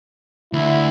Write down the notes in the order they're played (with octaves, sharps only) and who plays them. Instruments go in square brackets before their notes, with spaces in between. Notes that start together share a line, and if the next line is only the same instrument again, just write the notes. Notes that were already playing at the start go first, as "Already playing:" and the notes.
[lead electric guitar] D2 [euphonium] E4